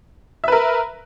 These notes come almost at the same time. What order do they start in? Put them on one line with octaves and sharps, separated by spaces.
E5 B4 A#4